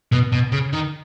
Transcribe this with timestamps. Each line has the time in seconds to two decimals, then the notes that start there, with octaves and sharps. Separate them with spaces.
0.12 B2
0.32 B2
0.52 C#3
0.73 D#3